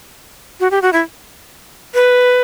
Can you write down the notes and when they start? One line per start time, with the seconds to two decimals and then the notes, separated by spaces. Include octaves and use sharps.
0.60 F#4
0.71 G4
0.82 F#4
0.93 E4
1.94 B4